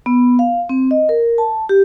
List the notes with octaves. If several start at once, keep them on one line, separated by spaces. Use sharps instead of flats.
B3
F5
C4
D#5
A#4
A5
G4